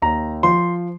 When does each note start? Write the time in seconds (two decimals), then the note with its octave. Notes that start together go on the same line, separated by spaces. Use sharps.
0.02 D#2 A#5
0.43 F3 C6